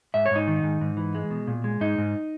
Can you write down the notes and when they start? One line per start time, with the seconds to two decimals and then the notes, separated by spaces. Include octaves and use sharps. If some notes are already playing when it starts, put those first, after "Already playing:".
0.14 G#2 E5
0.26 C#5
0.31 G#2 D#4
0.47 D#3
0.63 G#2
0.81 G#2
0.97 E3
1.15 G#3
1.30 B2
1.47 A#2
1.64 G#3
1.81 G#2 D#4
1.98 G#2